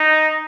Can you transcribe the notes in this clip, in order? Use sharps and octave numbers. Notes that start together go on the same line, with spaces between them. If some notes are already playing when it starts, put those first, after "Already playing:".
Already playing: D#4